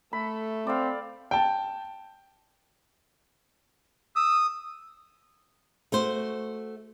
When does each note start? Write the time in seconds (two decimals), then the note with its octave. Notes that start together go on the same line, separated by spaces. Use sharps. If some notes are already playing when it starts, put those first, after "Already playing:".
0.13 A3 A4 B5
0.67 C4 D5 F5
1.31 G5 A5
4.16 D#6 E6
5.92 A3 F#4 C5